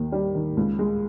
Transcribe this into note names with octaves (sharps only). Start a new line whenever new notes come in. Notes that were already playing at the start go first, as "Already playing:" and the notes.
Already playing: D#2 D#3
G3
D#3
C#2
G#3